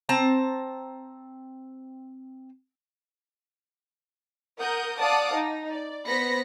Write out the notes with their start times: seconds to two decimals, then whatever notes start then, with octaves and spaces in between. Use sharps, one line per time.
0.09 C4 A5 A#5
4.58 A#4 F#5 D#6 G6
4.99 D5 F5 F#5 A5 D6 D#6
5.33 D#4
5.71 D5
6.07 B3 C5 B5 A#6 B6 C#7